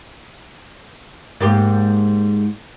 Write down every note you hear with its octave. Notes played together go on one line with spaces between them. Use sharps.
G#2 A#3 G4